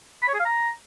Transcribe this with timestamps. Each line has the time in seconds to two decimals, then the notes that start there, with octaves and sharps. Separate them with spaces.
0.23 B5
0.28 C#5
0.34 G#4
0.40 F5
0.45 A#5